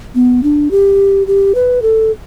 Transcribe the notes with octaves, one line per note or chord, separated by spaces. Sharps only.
B3
D4
G4
G4
B4
A4